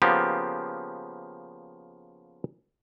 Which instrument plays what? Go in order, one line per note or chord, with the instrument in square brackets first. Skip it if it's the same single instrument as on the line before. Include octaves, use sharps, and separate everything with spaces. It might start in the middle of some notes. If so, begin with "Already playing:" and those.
[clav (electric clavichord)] C#3 F3 A#3 B3 G4